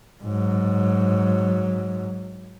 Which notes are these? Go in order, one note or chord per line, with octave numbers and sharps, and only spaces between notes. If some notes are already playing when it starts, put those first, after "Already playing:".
G#2 F#3